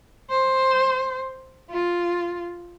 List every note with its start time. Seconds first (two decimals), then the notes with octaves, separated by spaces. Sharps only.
0.30 C5
1.70 F4